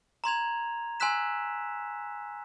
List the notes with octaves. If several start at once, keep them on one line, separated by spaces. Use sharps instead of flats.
A#5 C6 G#6 F7
G#5 C6 E6 F#6 B6 E7